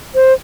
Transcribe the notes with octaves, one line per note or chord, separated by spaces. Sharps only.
C5